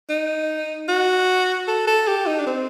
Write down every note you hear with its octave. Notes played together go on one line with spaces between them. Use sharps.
D#4
F#4
A4
A4
G4
D#4
D4
C4